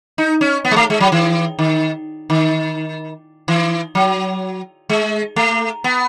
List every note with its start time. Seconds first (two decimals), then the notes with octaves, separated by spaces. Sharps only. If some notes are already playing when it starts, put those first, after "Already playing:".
0.18 D#4
0.41 C#4
0.65 B3
0.71 G#3
0.76 A3
0.90 G#3
1.00 F#3
1.12 E3
1.59 D#3
2.30 D#3
3.48 E3
3.95 F#3
4.89 G#3
5.36 A3
5.84 B3